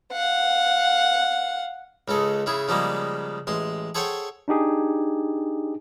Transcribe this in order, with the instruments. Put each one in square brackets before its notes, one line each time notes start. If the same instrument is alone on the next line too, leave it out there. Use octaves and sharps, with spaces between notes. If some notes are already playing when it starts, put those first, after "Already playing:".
[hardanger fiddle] F5 F#5
[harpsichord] C#2 C#3 G#3 A4
C#3 E4 G#4
C#3 F3 G3 G#3 A#3
A1 G#3 C6
G#4 A4 C5 C#5 F#5 G5
[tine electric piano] D4 D#4 G4 G#4